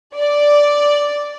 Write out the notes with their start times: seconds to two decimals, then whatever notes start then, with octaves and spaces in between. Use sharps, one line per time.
0.16 D5